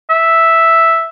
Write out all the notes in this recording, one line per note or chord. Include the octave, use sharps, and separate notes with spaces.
E5